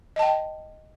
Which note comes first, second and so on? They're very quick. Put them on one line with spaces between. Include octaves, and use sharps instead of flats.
D#5 A5 G5